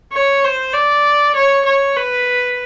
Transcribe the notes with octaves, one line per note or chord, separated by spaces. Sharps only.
C#5
C5
D5
C#5
C#5
B4